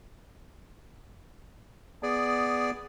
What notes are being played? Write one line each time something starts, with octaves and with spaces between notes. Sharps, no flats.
B3 G#4 D5